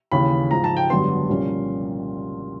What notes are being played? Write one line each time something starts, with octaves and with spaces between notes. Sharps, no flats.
D#2 C#3 E3 B5
G#2 F3 G#3 A#5
A5
G5
G#1 F#2 D3 G3 B3 C6
C2 A#2 F3 A#3 C#4